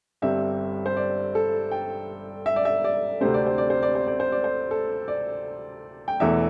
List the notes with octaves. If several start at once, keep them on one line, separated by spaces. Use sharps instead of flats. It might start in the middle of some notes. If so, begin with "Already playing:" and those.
G1 G2 G3 C4 E5
C5
D5
A4
G5
E5
D5
E5
D5
D2 C3 A3 C4 C5
D5
C5
D5
C5
D5
C5
D5
C5
D5
C5
A4
D5
G5
E1 E2 E3 A3 E5